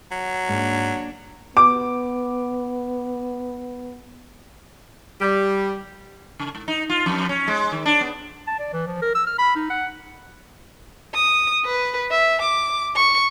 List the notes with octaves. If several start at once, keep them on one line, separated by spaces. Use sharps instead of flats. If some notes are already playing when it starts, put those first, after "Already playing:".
F#3
G#2 A#3 D4
B3 D6
G3
C#3
G#2
D#4
F4
F2
C#4
G#3
D#3
D4
B3
A5
D5
E3
F3
A#4
E6
F6
B5
D#4
F#5
D#6
B4
E5
D6
C#6